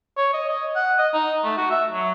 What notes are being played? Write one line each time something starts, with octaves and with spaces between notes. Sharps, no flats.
C#5
D#5
D#5
F#5
D#5
D#4
A3
F#4
E5
F#3